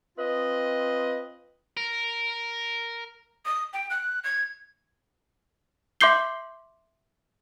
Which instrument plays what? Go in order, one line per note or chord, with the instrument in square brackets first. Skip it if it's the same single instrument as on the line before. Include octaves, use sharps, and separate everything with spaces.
[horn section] C4 F4 B4 D#5
[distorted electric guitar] A#4
[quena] D#6
G5
F#6
G#6
[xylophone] E5 C6 D6 G6 C7 G7